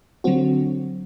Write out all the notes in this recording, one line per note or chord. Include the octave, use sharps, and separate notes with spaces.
D3 F#3 C4 F#4